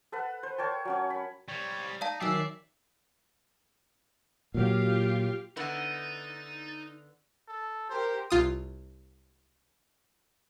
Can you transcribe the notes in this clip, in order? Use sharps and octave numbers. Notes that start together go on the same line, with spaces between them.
A4 B4 F#5
C5
A#4 C#5 G5 A5
F#3 C#4 C#5
B5
G3 C4 C#5
D#4 D5 F5 A5
D#3 F#3 D5 E5 G5 G#5 E6 C7
A#2 F#3 F4 G4 F5
D3 B3 D#4 E4 D#5 A6
A4
G4 A#4 C5
C2 F4 D#6